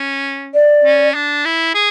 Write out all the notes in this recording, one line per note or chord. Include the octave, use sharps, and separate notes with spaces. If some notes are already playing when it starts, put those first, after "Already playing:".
Already playing: C#4
D5
C#4
D4
E4
G#4